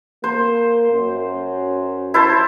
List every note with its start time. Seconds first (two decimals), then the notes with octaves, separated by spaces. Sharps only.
0.24 A#3 C5
0.92 F#2
2.14 E4 C5 A5